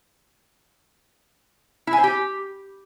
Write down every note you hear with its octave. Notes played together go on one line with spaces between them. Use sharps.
E4
G#5
C5
G4